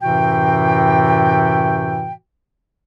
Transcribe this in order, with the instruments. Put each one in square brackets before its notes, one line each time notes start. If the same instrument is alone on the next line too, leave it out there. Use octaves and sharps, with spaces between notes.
[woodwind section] F#2 A2 C3 E3 F#4 G5